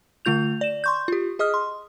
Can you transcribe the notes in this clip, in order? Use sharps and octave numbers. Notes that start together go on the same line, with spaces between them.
D3 A3 F4 G6 F7
D5 E7
C6 C#6 G6
F4 G4
G#4 D#5 D#6 F6
C6